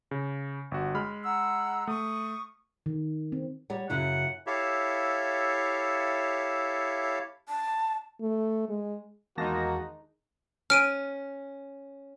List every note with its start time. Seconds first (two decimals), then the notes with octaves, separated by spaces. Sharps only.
0.11 C#3
0.71 G1 F#4
0.95 G#3 B5 F6
1.23 F#5 A#5 E6
1.87 A3 C#6 D#6
2.86 D#3
3.32 C4
3.70 G3 C#5 F#5
3.90 F#2 C#3 E4 F#5
4.47 E4 G4 A4 C#5 E5 F5
7.49 A5
8.21 A3
8.69 G#3
9.37 E2 D#3 G#3 A#3 D#4 F#4 A5 A#6
10.70 C#4 F6 D7 D#7